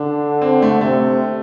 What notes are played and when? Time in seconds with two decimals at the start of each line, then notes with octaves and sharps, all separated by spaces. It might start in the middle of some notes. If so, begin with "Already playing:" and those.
Already playing: D3 D4
0.42 C4
0.62 A3
0.81 C3 A3